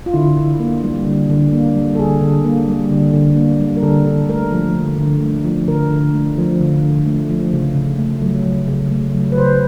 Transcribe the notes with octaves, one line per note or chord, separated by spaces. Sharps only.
F4
D3 E4
D3
A#3
G3
D3
D3
A#3
G3
A4
D3 G#4
D3
A#3
G3
D3
D3
A#3
G3
A#4
D3 A4
D3
A3 A#4
F3
D3
D3
A3
F3
D3 A#4
D3
A3
F3
D3
D3
A3
F3
C#3
C#3
A3
F#3
C#3
C#3
A3
F#3
B4
C#3 C5